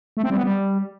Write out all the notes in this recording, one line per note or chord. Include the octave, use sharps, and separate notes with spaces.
A3
C4
G3
B3
G3